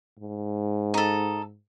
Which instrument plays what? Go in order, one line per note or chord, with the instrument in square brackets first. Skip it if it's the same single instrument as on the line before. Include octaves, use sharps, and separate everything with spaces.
[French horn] G#2
[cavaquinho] D#4 A4